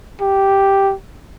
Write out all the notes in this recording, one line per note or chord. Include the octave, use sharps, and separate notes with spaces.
G4